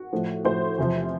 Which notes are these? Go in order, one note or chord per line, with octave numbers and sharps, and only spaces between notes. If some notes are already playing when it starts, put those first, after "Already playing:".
Already playing: F#4
A2 F3
A2 F3 C5
E2 C3 F3